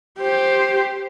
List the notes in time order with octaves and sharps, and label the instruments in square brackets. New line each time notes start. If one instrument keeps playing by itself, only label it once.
[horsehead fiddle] G4 C5